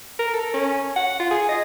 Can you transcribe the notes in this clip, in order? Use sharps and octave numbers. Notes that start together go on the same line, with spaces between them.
A#4
A4
C#4
F#5
F4
G#4
D#5